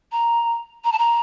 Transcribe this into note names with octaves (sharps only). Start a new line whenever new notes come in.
A#5
A#5
A5
A#5